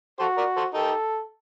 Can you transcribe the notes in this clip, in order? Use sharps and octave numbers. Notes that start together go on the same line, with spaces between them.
F#4 A4 C5
A#4 D5
A4 C5
D#4 G4 A4